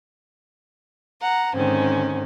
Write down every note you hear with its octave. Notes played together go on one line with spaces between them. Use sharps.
F#5 A#5
G#2 D3 D#3 C4 C#4